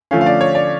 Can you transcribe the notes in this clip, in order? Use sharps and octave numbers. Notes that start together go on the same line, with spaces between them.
D3 F3 A3 C#4 F5
F5
D5
C#5
D5